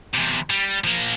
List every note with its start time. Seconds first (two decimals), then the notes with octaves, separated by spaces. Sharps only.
0.14 E2 C3
0.50 G3
0.84 F3 A#3